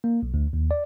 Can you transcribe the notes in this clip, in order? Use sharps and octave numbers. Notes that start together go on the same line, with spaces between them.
A#3
B1
D2
D#2
D5